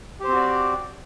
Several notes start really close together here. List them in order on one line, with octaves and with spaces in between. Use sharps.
G4 C5 C4 F#4 D5